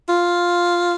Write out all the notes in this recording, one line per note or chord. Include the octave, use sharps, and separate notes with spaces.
F4